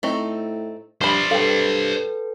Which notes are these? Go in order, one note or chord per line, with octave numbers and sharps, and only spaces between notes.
A2 A3 C4 D#4
G2 F3 C5 D5 B5
G2 A4 B4 F5 G5